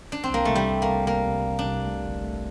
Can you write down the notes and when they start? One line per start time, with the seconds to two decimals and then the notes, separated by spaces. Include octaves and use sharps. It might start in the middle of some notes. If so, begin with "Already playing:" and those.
0.12 D4
0.24 C4
0.30 C2 A#3
0.45 C2 A3
0.55 G3
0.69 C2
0.82 A#3
0.88 C2
1.07 C2 A#3
1.27 C3
1.47 C3
1.59 D4
1.65 C2
1.85 A3
2.05 G1
2.24 A3